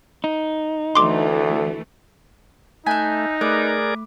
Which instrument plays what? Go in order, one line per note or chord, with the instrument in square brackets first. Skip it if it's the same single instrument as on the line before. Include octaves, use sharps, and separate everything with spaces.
[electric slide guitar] D#4
[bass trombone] D2 [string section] E3 A3 [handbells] C6 D6
[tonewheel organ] A3 [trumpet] D#4 [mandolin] E5 G#5 [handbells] F#6 G6 B6
[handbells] A3 D6 [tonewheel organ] G#4 A#4 D5 [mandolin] B4